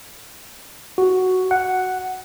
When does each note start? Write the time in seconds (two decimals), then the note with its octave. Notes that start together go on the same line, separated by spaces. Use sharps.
0.98 F#4
1.51 F#5